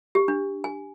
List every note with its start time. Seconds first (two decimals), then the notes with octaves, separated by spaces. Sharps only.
0.15 G4
0.28 D4
0.64 G#5